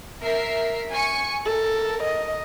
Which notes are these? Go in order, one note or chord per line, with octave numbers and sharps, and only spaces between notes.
A#4 E5 C7
G#5 C#6 C#7
A4 A#4
D#5